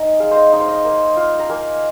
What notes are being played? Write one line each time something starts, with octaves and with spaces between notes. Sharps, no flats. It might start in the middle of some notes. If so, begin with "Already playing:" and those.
Already playing: D#4 G#5
G#3 F5
C5 D#5
D#4
C5
D#5
A#3
F4
A#5
A#3 G#5